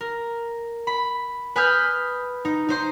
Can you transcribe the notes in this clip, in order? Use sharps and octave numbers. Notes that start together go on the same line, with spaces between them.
A#4
B5
B4 G#5 B5 D#6 F6 G6
D#4
D#4 C5 C6